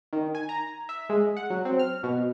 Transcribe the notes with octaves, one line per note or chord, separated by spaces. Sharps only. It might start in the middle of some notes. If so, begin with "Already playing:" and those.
D#3
G#5
A#5
E5
G#3
F#5
F#3
C4
F6
B2